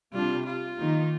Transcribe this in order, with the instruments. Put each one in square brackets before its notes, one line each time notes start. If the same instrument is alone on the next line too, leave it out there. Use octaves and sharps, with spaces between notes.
[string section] C3 G3 D4 [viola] F4
[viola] F4
[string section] D#3 A#3 D#4